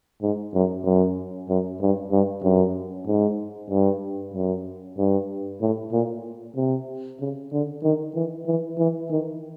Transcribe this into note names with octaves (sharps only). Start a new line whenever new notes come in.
G#2
F#2
F#2
F#2
G2
G2
F#2
G#2
G2
F#2
G2
A2
A#2
C3
C#3
D3
D#3
E3
E3
E3
D#3